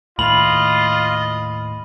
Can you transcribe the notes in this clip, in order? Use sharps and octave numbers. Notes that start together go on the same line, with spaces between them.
D#2 A2 F4 D#5 B5 F#7